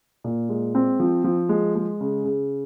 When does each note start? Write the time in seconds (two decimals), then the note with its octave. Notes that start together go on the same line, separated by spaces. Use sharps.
0.24 A#2
0.49 G#3
0.75 C4
1.00 F3
1.24 F3
1.49 G#3
1.75 G#3
2.01 C#3
2.25 C#3